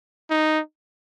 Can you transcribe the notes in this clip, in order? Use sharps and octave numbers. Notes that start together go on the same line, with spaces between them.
D#4